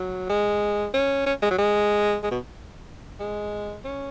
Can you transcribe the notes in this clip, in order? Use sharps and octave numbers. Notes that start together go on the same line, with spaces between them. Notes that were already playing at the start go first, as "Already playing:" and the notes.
Already playing: F#3
G#3
C#4
C#4
G#3
F#3
G#3
G#3
B2
G#3
C#4